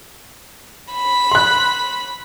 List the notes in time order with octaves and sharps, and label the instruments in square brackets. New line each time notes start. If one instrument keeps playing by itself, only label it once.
[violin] B5
[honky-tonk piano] C6 F#6